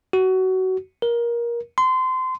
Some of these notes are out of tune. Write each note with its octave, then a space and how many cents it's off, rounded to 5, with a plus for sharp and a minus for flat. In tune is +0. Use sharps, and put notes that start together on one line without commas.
F#4 +20
A#4 +20
C6 -25